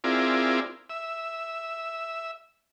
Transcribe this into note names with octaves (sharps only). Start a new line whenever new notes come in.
C4 E4 F4 G#4 A#4 D5
E5